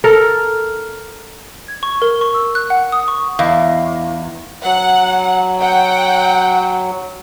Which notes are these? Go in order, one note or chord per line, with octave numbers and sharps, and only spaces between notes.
A4 A#4
G#6
C#6
A#4
C#6
E6
F#6
F#5
D#6
C#6
E2 D#5 F5
F#3 F#5
F#5 G5